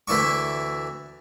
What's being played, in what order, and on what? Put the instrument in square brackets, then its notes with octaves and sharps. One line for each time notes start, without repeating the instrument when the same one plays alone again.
[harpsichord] D2 E3 E4 D5 C#6